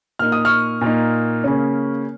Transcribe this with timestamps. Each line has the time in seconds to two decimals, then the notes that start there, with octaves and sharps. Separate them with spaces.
0.19 A#2 A#3 D#4 F6
0.32 D#6
0.45 C#6 F6
0.81 A#2 A#3 D#4
1.44 C#3 A#3 C#4